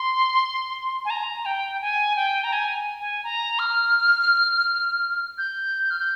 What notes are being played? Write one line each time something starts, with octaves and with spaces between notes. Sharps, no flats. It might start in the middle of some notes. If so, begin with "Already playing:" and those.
Already playing: C6
G#5
A#5
G5
G#5
G5
A#5
G#5
G#5
A#5
F6
G6
F6
G6